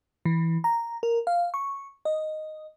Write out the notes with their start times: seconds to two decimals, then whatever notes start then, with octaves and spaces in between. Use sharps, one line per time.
0.25 E3
0.64 A#5
1.03 A#4
1.27 F5
1.54 C#6
2.05 D#5